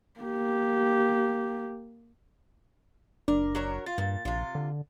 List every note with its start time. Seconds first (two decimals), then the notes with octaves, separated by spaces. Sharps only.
0.21 A#3 G4
3.28 F#1 D4 A#4
3.55 F#3 A#4 C#5
3.86 F4 A6
3.98 G2 A#2
4.25 A#1 C3 F4
4.55 D3